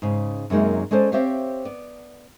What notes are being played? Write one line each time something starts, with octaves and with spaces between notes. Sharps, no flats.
G#2 C#3
F#2 C3 F#3 G#3 A#3 D#4
G#3 C#4 A4 C5 D5
C4 G4 C5 C#5 E5 F5
B3 D5